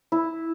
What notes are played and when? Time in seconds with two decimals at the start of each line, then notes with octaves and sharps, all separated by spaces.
0.12 E4